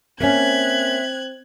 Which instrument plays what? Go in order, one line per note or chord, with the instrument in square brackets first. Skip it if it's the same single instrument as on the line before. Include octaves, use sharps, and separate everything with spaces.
[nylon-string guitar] A#3 C#4 [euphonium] C4 [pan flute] E5 [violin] F#6 G#6